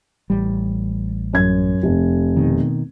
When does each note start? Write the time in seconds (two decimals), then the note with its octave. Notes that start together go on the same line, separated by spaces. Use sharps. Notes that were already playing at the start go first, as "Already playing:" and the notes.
0.30 A1 G3
1.33 F#2 G#6
1.83 F1
2.37 B2 D#3